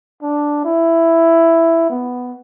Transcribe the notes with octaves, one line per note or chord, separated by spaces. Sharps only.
D4
E4
B3